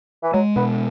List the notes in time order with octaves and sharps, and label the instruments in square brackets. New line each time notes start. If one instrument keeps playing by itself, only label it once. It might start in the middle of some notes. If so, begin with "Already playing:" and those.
[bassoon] E3
[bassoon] F#3 [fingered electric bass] G#3
[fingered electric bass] B2 [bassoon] B3